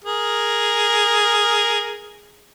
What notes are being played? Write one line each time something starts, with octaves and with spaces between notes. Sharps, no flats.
G#4 A#4